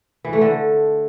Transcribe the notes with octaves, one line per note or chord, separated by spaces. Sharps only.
E3
A3
D3